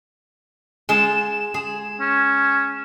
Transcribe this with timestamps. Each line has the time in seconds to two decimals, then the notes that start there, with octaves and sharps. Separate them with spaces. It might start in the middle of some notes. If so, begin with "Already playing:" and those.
0.89 G#3 F4 G#4 E7
1.54 G#4
2.00 C#4